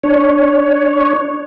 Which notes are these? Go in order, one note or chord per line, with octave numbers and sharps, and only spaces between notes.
D4 C#5